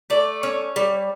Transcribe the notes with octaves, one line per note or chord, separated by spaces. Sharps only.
A3 D5
C#4
G3